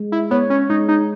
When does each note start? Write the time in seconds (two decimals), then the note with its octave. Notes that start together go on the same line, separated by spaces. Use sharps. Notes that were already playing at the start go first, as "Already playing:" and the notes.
Already playing: G#3
0.12 E4
0.31 B3 C#5
0.50 C#4
0.70 G#3 D#4
0.88 D#4